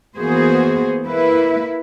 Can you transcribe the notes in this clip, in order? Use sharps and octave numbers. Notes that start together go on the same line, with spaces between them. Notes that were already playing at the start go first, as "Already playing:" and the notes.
E3 A#3 B3 F#4 G#4 C5
A#3 E4 B4